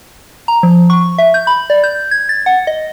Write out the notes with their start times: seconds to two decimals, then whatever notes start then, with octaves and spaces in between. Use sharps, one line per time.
0.48 A#5
0.63 F3
0.90 C#6
1.18 E5
1.34 G6
1.47 B5
1.70 D5
1.83 G6
2.11 G#6
2.29 A6
2.46 F#5
2.67 D#5